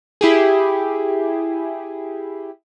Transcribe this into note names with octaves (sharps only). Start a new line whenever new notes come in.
E4 G4 G#4